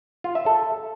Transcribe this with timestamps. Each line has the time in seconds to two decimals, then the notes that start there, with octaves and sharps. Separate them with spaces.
0.24 F4
0.35 E5
0.46 A4